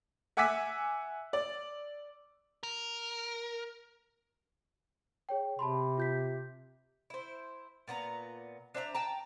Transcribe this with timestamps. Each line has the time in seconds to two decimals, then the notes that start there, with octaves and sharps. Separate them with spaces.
0.37 E5 F#5 G#5 D6 E6 B6
1.33 D5
2.63 A#4
5.29 G#4 C#5 G5
5.59 C3 A5 B5 C6
5.98 F4 G6 B6
7.10 E4 C5
7.88 A#2 B3 F4 A#5
8.74 D4 C5 E5 A#5
8.94 G5 A5 A#5